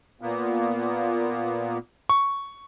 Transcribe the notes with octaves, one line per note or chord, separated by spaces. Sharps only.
A#2 A#3 B3
C#6